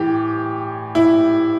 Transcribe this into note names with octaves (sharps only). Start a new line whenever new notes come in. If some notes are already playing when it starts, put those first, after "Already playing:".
Already playing: A2 E3 G3 G4
E4